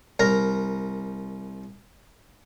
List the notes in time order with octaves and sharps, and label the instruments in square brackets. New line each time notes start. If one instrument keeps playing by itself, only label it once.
[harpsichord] C2 A#4 A#5